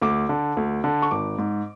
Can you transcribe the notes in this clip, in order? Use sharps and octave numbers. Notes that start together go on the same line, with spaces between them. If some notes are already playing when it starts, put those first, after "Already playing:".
D2 D6
D3
D2
D3
C#6
G#1 D6
G#2